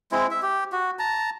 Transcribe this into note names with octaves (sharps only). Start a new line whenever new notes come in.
G#3 C4 E4
E5
G4
F#4
A5 A#5